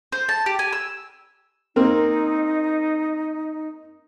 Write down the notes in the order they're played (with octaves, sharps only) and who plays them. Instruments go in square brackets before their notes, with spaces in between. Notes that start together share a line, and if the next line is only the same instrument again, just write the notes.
[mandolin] C5
A5
G4
G#5
E6
[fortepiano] A#3 C4 A#4 [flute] D#4